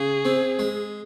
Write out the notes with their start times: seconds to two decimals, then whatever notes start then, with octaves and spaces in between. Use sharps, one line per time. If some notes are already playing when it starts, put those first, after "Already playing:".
Already playing: C#3 G#4
0.25 C4
0.59 G#3